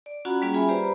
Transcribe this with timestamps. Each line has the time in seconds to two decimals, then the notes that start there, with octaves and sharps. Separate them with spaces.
0.06 D5
0.25 C#4 F4 F#4 F#5 A#5 B5
0.42 G3 A#3 C#4 F4 G#4
0.54 F4 G#4 E5 G#5 B5
0.69 G4 B4 C5 D5 A#5 B5